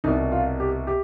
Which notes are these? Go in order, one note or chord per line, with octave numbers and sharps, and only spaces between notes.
C2 B2 D#4
F4
G4
G4